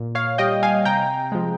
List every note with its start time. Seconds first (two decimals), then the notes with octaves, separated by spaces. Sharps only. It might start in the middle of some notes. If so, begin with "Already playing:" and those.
Already playing: A#2
0.15 C#5 F5
0.38 G3 D#5 G5
0.63 F5 G#5
0.85 C3 G5 A#5
1.32 F3 G#3